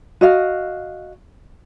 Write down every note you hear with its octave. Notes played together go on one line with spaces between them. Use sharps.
F#4 D#5 F5